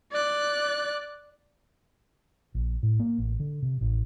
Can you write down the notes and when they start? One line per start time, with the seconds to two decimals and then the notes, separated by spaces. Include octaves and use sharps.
0.12 D5 F#6
2.54 A#1
2.83 A2
3.00 A#3
3.18 A1
3.40 D3
3.62 C3
3.81 A1